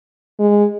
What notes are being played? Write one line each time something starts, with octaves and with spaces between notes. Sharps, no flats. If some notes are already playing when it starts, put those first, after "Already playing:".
G#3